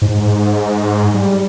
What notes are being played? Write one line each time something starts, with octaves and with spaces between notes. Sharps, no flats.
G#2
G3